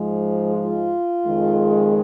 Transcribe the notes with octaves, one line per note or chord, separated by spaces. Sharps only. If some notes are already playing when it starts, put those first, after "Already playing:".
Already playing: G#2 F3 G#3
F4
F2 D#3 G#3